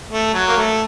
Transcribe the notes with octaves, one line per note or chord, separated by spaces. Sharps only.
A3
F#3
A#3
A3